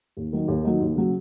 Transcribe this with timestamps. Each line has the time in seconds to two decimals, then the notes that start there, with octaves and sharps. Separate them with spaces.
0.17 D#2
0.33 D#3 F#3 D#4
0.48 D#2
0.64 D#3 F#3 D#4
0.81 D#2
0.96 C#3 F#3